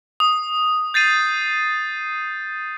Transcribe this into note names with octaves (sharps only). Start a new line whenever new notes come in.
D#6
G6 A6 C7 D#7